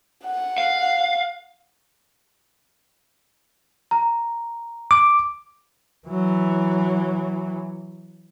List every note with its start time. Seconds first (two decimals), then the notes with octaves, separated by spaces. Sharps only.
0.25 F#5
0.58 F5
3.91 A#5
4.91 D6
6.08 E3 F#3